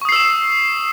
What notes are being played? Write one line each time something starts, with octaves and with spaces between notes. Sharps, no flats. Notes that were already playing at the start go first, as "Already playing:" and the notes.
C#6 D#6 E6 C7 E7